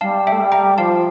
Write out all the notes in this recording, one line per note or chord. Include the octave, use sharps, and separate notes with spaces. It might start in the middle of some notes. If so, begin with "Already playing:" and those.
G3 F5 A5
A3 E5 G5
G3
G5 A#5
F3 F5 A5